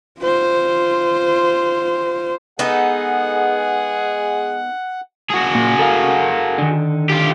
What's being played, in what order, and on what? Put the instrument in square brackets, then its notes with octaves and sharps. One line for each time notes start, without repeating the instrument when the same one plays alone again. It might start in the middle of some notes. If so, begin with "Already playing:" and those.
[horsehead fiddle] F4 C5
[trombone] G#3 [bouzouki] B3 D#4 A4 [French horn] G#4 [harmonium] F#5
[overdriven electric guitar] F#4 G#4
[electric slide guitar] A#2
A4 A#4 F5
D3 D#3
[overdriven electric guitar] F4 G4